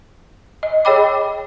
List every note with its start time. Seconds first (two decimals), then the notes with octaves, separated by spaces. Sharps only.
0.63 D#5
0.85 G#4 C#5 D#5 G5 B5 D6